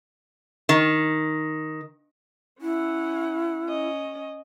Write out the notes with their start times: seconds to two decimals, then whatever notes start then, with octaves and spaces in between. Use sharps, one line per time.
0.69 D#3
2.62 C#4 E4 F#5
3.66 C#4 D#5